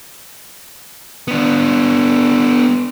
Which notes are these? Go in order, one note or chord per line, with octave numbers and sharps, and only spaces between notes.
B3 D4